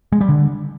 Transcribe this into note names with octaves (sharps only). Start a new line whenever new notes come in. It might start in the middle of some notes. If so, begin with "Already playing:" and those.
G#3
G3
D3